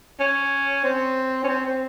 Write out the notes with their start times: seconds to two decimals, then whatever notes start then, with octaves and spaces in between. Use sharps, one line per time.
0.20 C#4
0.84 C4
1.43 C#4
1.49 C4
1.65 C4